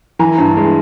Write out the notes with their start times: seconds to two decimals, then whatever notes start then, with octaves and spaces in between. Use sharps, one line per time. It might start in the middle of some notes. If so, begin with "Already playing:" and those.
0.19 E3 G#5 A#5
0.38 G2
0.57 G#3